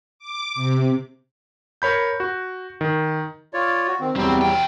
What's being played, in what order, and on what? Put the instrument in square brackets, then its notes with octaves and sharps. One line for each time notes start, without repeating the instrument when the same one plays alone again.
[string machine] D6
C3
[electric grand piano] A#4 C#5 B5 G6
F#4
D#3
[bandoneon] F4 C#5 D5
F#4
D#3 C4
[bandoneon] E2 F#3 G3 [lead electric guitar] C4
[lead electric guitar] E3 G5